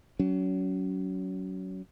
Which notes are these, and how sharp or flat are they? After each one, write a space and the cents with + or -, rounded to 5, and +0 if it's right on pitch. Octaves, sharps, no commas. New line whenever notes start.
F#3 +20 C#4 +30